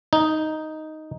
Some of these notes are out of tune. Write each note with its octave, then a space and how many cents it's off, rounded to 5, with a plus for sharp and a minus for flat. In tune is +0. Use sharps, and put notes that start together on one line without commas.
D#4 +5